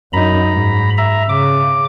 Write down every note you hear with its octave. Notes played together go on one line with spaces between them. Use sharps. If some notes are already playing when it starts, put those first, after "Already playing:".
F#2 D#4 A#5 B5
G#2
E5 A#5
C#3 D6